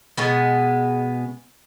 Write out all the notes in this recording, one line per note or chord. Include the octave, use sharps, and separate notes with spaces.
B2 G#3 B3